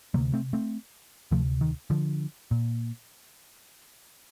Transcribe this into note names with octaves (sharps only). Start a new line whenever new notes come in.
D2 C3 G3 A#3
A3 C4
A3 C4
D2 C3 F3 A3
D#3
D3 F3
A#2